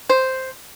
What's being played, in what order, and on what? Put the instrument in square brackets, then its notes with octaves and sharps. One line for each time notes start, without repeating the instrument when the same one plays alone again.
[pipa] C5